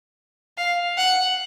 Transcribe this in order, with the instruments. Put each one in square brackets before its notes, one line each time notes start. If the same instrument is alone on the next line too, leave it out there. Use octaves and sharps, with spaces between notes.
[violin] F5
F#5